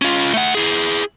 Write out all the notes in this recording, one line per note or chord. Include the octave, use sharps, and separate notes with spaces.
C#4 F4
A3 F#5
E4 G#4